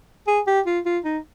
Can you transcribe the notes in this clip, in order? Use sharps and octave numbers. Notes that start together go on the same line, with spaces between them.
G#4
G4
F4
F4
D#4